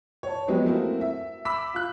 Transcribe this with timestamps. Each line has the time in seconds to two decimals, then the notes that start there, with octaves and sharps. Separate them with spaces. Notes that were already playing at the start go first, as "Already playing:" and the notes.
0.23 C#5 A5
0.48 F3 F#3 G#3 B3 F#4 G4
0.66 A3 A#3 C4 E4 F#4
1.01 E5
1.45 B5 D6 E6 B6
1.74 F4 F#6